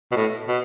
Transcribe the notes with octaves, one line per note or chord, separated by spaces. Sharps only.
B2
A2
B2